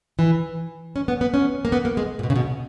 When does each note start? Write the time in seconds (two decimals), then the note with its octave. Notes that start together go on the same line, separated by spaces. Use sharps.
0.19 E3
0.96 C#4
1.08 B3
1.21 B3
1.34 C#4
1.65 A#3
1.72 B3
1.85 A#3
1.97 G#3
2.19 A#2
2.23 B2
2.30 C#3
2.36 B2